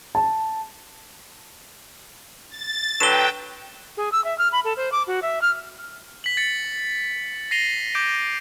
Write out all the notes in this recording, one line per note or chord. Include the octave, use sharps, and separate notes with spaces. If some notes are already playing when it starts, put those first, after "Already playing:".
A5
A6
D3 F#3 B4 G5 E7 G7
G#4
E6
E5
F6
B5
A4
C5
D6
F#4
E5
F6
B6 F#7
A6 C#7
A#6 C7 D#7 F7 G7
D6 G6 D7